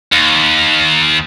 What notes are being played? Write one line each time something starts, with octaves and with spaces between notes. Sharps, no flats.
D#2